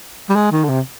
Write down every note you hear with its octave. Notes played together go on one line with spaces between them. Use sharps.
G3
G#3
D#3
D3
C3